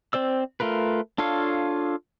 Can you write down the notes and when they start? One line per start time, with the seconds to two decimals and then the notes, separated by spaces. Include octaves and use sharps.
0.13 C4 C5 D5 E6
0.60 A3 F4 A#4 B4
1.18 D4 F4 A4 C#5 F5